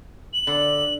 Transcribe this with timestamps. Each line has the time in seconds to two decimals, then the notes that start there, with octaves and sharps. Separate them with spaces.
0.33 F#7
0.47 D3